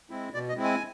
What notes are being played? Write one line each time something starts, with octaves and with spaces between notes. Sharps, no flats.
G#3 C4 E4
B2 D5
D#5
G#3 C4 E4
G#5